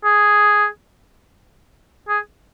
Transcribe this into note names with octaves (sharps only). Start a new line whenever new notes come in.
G#4
G#4